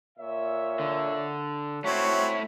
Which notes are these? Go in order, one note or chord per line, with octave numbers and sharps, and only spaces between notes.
A#2 C#5 E5
D3
A3 C4 E4 F#4 C#5